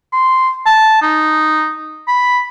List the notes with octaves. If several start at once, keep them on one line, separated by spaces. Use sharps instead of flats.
C6
A5
D#4
B5